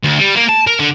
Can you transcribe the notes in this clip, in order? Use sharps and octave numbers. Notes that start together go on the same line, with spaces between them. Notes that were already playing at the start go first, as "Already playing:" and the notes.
D2
G3
A#3
A5
A#4
D3